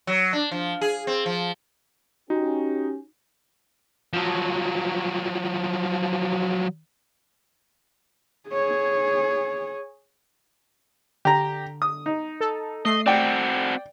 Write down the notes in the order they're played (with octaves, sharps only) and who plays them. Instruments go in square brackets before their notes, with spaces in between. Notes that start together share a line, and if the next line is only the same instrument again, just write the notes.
[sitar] F#3
D4
F3
G#4
C4
F3
[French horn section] C#4 G4 [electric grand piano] D#4 [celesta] F#4
[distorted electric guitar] F3 F#3
[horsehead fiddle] G#4 C#5
[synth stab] D3 [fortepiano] G4 A#5
[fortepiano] D#6
D#4
[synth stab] A4
[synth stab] A3 C7 [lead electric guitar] D#5
[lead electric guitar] C4 F#4 [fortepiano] D5 G5